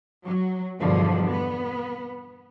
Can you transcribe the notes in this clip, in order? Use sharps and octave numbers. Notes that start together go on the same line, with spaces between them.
F#3
E2 G2 B2 D3 F3
B3